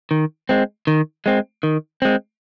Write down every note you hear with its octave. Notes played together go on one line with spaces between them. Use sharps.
D#3
G#3 C4
D#3
G#3 C4
D#3
G#3 C4